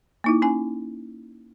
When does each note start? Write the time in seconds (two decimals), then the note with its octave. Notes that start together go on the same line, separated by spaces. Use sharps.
0.24 A#3 D#4 E4
0.42 C#4 G#5